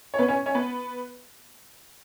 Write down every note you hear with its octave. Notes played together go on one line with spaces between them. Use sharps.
C#5
B3 B4
C#4 C#5
C#4 C#5
B3 B4